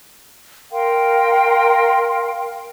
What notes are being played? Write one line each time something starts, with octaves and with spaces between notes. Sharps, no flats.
A#4 F5 G5 C6